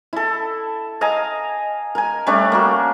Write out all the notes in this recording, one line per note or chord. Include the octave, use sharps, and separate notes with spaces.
E4 A4
D#5 F5 G#5 A#5
A#4 G#5
G3 A3 C#4 D4
A#3 F#4